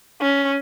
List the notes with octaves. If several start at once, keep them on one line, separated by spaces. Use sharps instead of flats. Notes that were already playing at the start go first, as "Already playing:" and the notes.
C#4